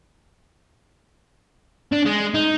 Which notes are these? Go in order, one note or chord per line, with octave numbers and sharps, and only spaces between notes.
D4
G#3
D#4